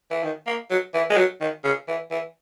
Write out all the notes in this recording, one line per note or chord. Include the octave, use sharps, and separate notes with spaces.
E3
D#3
A#3
F#3
E3
G#3
F#3
D#3
C#3
E3
E3